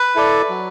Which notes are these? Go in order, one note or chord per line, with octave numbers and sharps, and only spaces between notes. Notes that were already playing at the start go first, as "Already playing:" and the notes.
Already playing: B4
E4 A4 D5
F#3